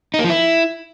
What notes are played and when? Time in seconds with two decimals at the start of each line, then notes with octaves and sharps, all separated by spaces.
0.14 D#4
0.19 A#3
0.24 F3
0.29 E4